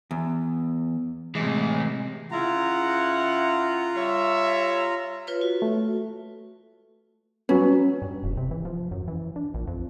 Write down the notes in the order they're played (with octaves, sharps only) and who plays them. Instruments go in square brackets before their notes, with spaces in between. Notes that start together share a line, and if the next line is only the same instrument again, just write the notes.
[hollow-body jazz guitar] E2
[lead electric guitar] A2 E3 [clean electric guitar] C3 G#3
[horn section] C#3 E4 F#5 [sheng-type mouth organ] F4 A#5
[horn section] G3 C#5 E5
[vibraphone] F4 B4 C#5
F#4
[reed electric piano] A3
[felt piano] F#3 B4 [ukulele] C#4
[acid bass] G2
E1
C3
E3
F3
F#2
E3
D4
A#1
F2